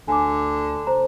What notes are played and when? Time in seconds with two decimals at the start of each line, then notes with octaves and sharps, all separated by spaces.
0.08 D2 D3 G#5 D6
0.87 F1 C5 A#5